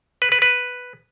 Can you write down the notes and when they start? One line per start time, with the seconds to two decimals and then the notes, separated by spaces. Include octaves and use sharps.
0.22 B4
0.32 B4
0.42 B4